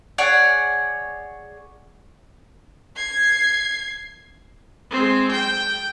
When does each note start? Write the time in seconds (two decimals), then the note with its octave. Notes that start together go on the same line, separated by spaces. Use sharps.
0.18 G#4 C#5 D5 F#5
2.97 G#6 C7
4.91 G#3 C4
5.31 G5